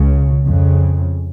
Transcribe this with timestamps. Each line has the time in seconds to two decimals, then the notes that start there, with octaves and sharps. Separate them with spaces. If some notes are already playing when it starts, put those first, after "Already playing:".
Already playing: C#2 C#3
0.45 F2 C#3